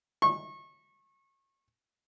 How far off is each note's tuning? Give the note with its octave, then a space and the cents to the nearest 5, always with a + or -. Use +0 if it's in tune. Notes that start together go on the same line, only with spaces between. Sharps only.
C#6 -30